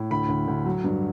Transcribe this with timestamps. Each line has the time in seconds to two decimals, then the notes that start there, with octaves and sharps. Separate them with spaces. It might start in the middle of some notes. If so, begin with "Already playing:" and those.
Already playing: A2
0.11 D2 B5
0.29 D2
0.48 D2
0.66 F#3
0.84 G2